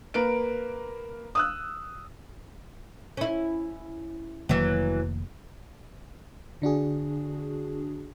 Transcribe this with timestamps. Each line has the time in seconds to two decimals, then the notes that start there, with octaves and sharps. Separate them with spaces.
0.14 A#3 A#4 B4 D7
1.35 D#6 E6 F#6
3.17 C#4 E4
4.49 F1 D#3 E3 F#3 A#3
6.62 D3 D4 F#4 G#4